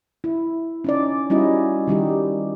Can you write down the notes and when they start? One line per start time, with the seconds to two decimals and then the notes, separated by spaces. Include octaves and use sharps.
0.24 E4
0.84 C#4 D#4 D5
1.30 G3 C#4 D#4 E4 F#4 D#5
1.87 D#3 G3 D#4 G4